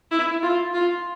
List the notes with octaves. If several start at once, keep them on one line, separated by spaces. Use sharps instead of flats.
E4
F4
F4